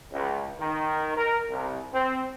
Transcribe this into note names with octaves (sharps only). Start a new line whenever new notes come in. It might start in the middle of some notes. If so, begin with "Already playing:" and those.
C#2
D#3
A#4
C2
C4